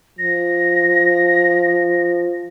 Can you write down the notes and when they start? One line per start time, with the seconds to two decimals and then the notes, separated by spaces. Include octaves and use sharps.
0.19 F3 A#6